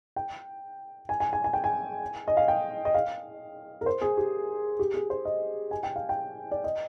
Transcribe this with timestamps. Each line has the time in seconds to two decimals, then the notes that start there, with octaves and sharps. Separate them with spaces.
0.16 G5
1.09 G#5
1.20 G#5
1.33 G#5
1.44 G#5
1.53 G5
1.64 G#5
2.28 D#5
2.37 F5
2.48 G5
2.85 D#5
2.95 F5
3.81 A#4
3.86 C5
4.01 G#4
4.17 G4
4.79 G4
4.94 G#4
5.10 C5
5.25 D#5
5.71 G#5
5.83 G5
5.96 F5
6.09 G5
6.52 D5
6.64 D#5